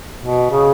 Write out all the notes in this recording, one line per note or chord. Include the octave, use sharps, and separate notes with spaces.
B2
C#3